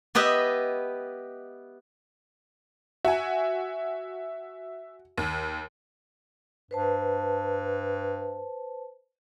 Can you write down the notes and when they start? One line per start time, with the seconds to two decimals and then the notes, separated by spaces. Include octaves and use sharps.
0.15 B3 G4 B4 D#5 E5
3.05 F#4 E5 G#5
5.18 D#2
6.71 G2 B4 C5 A5